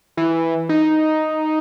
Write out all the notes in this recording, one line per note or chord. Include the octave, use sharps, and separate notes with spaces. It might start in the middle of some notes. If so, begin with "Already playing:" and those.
E3
D#4